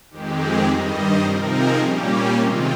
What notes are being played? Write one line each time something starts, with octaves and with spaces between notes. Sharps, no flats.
F2 D#3 G#3 C4 G4
G#4
G2 D#3 G3 D#5
C5
C3 F3 C4 D#4 A#4
G#4
A#2 G3 A#3 C#4 G4
C3 D#3 G#3 C4 F4